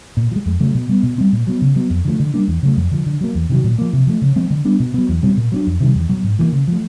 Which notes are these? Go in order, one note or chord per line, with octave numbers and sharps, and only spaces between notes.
A#2
F3
G#3
F2
C#3 F#3 A3
B2
G3 B3
B2
G3 C4
A#2
F#3 B3
C#3
F#3 B3
F2
D3 F3 A3
D3
G3 A#3 D4
E2
C#3 F#3 A3
F2
D3 F3
D3
F#3 A#3
E2
C3 D#3 F#3
A#2
F3 A#3
C3
F3 A3
C#3
F3 G#3 C4
D3
G3 B3 D4
B2
F#3 B3
E2
B2 G3 C4
A#2
F#3 B3 D4
F2
C3 D#3 G3
E2
B2 F#3
G#2
E3 G3 A#3
C#3
F3 A3